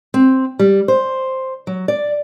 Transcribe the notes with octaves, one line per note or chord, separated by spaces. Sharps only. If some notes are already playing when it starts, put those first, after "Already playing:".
C4
G3
C5
F#3
D5